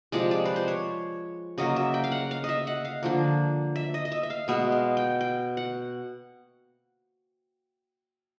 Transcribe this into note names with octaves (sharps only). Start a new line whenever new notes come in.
C3 F3 G#3 D5
D5
B4
C5
C#5
C#3 F#3 A#3 D#5
E5
G5
F5
F#5
F5
D#5 E5
F#5
F5
D3 F3 A#3
E5
D#5
D#5
E5
E5
F5
B2 G#3 B3 E5
F5
G5
G5
F#5